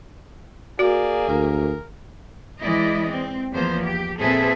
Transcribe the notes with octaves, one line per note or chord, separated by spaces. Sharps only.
A#3 F#4 G#4 D5
D2 A#4
E3 G#3 E4 D5 D#5
C4
E2 F3 A#3 B3 C5
G4
A#2 C4 G#4 A4 B4 E5